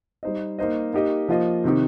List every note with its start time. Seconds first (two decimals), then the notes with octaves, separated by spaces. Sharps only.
0.23 G3 D#4 C5 D#5
0.59 A#3 D#4 C5 D#5
0.93 A#3 D#4 G4 D#5
1.28 F3 A#3 F4 D#5
1.64 C3 D#3 C4 D#4 G4